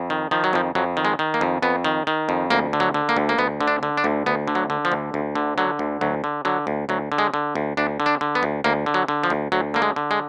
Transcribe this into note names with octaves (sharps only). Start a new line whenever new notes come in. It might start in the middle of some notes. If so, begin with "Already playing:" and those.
Already playing: F2
D#3
D#3 F3
F#3
F2 F3
F2 F#3
D#3
G#3
D#3
A#3
F2
F2 B3
D#3
D#3
F2
D2 A#3
D3
F#3
D3
A#3
D2
A#3
D2 B3
D3
D4
D3
D4
D2
D2 B3
D3
F#3
D3
F3
D2
D2
D3
D3 F#3
D2
D2 F#3
D3
D3 F#3
D2
D2 F#3
D3
G#3
D3
D2
D2 D4
D3
D4
D3
B3
D2
D2 A#3
D3
F#3
D3
F3
D2
D2 F#3
D3 A#3
G#3
D3
G#3